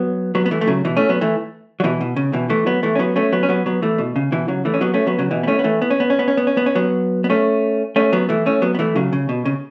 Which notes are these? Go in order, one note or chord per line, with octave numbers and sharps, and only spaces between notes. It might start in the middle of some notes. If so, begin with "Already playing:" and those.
Already playing: F#3 B3
F#3 B3
B3
E3 A3
A3
C#3 F#3
B2 E3
A3 C#4
F#3 B3
E3 A3
F#3
B2 E3
B2
C#3
B2 E3
E3 A3
F#3 B3
E3 A3
C#4
F#3 B3
A3 C#4
F#3 B3
C#4
F#3 B3
F#3 B3
E3 A3
B2
C#3
B2 E3
C#3 F#3
E3 A3
C#4
F#3 B3
A3 C#4
F#3 B3
C#3 F#3
B2 E3
B3
A3 C#4
B3
E3 A3
B3
C#4
B3
C#4
B3
C#4
B3
C#4
B3
C#4
F#3 B3
B3
A3 C#4
A3 C#4
F#3 B3
E3 A3
A3 C#4
F#3 B3
B3
E3 A3
C#3 F#3
C#3
B2
C#3